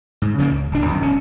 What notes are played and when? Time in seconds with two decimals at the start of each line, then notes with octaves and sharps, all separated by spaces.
0.22 G#2
0.38 C#3 F3 G#3 A#3
0.51 C#2
0.72 D1 D4
0.86 B1 F#2 D#3
1.01 E1 C#4